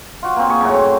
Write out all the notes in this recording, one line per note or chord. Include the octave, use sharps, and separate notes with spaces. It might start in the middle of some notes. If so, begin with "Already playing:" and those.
F4 F#4
A#3 C4
G#4 C#6
F#2 A2 C#3 F#4
C4